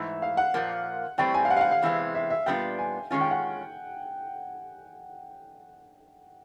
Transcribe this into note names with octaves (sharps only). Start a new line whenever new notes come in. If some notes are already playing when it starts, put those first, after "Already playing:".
Already playing: G#2 E3 A3 E5
F5
F#5
A#2 F3 A#3
A2 E3 G3 C4 G5
G#5
F5
F#5
F5
F#5
F5
E2 C3 E3 G#3 C4
E5
E5
A#2 G3 B3 D4 F4 G5
G#5
D#3 G#3 C#4 F4 G#5
G5
F#5